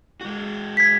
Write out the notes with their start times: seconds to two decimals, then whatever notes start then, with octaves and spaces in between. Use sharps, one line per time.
0.21 G#3 F#4
0.77 G#6 B6